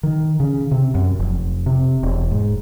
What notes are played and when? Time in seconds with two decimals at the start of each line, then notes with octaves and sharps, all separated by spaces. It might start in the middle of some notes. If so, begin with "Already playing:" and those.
0.03 D#3
0.40 C#3
0.71 C3
0.95 F#2
1.19 F1
1.66 C3
2.03 E1
2.31 G#2